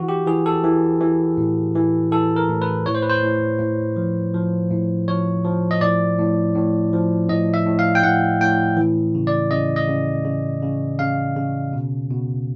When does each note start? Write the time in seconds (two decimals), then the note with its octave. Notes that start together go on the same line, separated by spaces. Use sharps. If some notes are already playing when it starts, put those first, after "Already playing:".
Already playing: E3 F#4
0.09 G4
0.27 E3 G#4
0.46 A4
0.64 E3
1.01 E3
1.38 A2
1.76 E3
2.12 E3 A4
2.36 A#4
2.50 A2
2.62 B4
2.86 A2 C#5
2.95 C5
3.02 B4
3.09 C5
3.23 A2
3.59 A2
3.96 F3
4.34 F3
4.71 A2
5.08 F3 C#5
5.44 F3
5.71 D#5
5.81 A2 D5
6.18 A2
6.55 A2
6.93 F3
7.29 A2 D#5
7.54 E5
7.66 A2
7.79 F5
7.95 G5
8.03 A2 F#5
8.41 A2 G5
8.77 E3
9.15 C#3
9.27 D5
9.51 C#3 D#5
9.76 D#5
9.88 C#3
10.25 C#3
10.63 C#3
10.99 C#3 F5
11.36 C#3
11.73 B2
12.10 B2